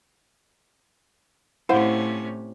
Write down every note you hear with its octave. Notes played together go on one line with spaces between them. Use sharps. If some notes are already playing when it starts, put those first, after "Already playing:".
A2 C3 C#4 E4 C5 F5 F#5